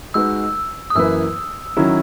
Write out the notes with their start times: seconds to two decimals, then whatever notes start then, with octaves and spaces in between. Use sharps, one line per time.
0.14 G#3 D#4 F#4 B4 E6
0.90 D#6
0.95 F#2 E3 A#3 E4 B4 E6
1.77 D#3 F#3 C#4 E4